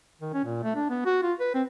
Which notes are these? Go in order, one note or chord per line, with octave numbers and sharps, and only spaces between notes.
D#3
C#4
A#2
A3
D4
B3
F#4
F4
B4
C4